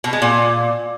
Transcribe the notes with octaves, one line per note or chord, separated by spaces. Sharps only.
B2
G#3
A#2